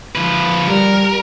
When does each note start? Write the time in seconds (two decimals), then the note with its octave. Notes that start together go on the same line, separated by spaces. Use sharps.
0.15 F3 B4
0.69 G3 A#4